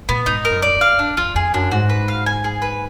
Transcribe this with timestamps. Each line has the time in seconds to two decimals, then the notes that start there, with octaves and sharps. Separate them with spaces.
0.09 A#2 B3
0.26 G#2 D#4
0.45 A#4
0.51 F#2
0.62 D5
0.75 F#2
0.81 F5
0.99 D4
1.17 F2 F4
1.35 F2 G#4
1.54 F#2 D4
1.71 G#2 F#4
1.90 B4
2.08 F5
2.26 G#5
2.44 G#4
2.62 B4